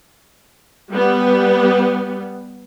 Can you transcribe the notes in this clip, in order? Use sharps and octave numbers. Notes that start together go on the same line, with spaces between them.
G3 B3